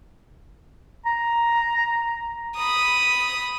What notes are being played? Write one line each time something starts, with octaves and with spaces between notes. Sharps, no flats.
A#5
B5 D#6